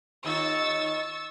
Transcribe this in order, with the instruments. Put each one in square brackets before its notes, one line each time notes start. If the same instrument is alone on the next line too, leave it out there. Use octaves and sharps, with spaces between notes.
[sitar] D#2 D#4 F4 [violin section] C#6 E6 A6